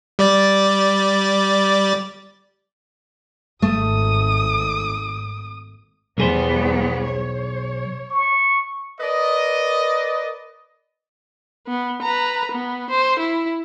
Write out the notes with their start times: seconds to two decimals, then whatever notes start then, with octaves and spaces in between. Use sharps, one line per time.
0.19 G3 D5 A6
3.62 G#1 A3 D#6
6.18 B1 E2 G3 B3 G#4 C5
7.05 C#5
8.11 C#6
9.00 A#4 B4 D5 D#5
11.67 B3
12.02 B4 A#5
12.51 B3
12.90 C5
13.19 E4